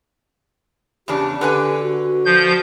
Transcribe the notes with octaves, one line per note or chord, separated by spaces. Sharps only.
E2 C#3 D4 G4
D3 B4 G#5
F#4
F3 G6